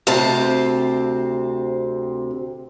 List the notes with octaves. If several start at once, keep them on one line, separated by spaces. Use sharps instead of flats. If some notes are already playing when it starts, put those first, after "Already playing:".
D2 C3 C4 C5 A5